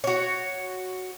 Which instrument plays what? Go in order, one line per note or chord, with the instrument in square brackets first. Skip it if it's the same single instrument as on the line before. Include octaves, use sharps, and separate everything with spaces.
[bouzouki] F#4 C#5